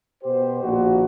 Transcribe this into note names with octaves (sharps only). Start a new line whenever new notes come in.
B2 G4 C5
A#1 D#2 F#4